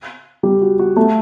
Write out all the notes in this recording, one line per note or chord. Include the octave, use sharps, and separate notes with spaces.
G3 G4
F#4
F#4
A3 A4